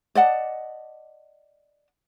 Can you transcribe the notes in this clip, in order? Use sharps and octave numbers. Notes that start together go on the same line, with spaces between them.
D5 D#5 F#5 A5